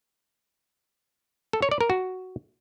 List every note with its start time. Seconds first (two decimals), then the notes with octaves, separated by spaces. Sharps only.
1.53 A4
1.62 C#5
1.71 D5
1.81 A#4
1.90 F#4